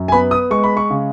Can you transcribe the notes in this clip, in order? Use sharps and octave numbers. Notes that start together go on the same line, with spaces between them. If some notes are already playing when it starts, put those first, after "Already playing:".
Already playing: F#2
G#5
B3 B5
D#6
G#3 C#6
B5
C#6
C#3